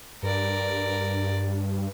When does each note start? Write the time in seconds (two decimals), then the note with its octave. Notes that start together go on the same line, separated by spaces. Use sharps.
0.23 G2 A#4 D5